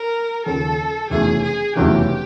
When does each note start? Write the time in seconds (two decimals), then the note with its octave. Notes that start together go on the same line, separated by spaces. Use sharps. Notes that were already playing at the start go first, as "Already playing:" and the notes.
Already playing: A#4
0.46 D#2 C#3 F3 A4
1.10 F1 E2 C#3 F#3 A3 G#4
1.43 G#4
1.76 F1 E2 C#3 F#3 A3 G4